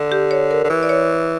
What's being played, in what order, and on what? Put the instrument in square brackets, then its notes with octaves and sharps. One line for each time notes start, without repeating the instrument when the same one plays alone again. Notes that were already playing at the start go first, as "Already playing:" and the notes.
Already playing: [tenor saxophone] D3
[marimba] G4
C#5
A#4
[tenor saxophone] D3
E3
[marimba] D5
C#5